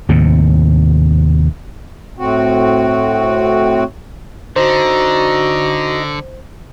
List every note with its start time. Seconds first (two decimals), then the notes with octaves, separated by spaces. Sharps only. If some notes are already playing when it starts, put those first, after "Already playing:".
0.09 D#2 A2 C3
2.18 A2 C4 F#4
4.56 D3 D#4 F#4 C5 A#5